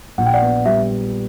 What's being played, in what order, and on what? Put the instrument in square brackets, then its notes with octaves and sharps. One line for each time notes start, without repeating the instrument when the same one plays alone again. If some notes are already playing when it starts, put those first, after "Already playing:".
[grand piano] A#1 [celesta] F#5
[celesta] G5
D5 F#5
[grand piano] B3
[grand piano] G3 [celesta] E5